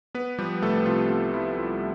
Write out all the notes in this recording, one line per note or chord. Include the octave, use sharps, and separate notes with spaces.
B3 B4
F3 G3 G4
C2 A3 A4
C3 F4
B3 F4
F3 E4
C2 F4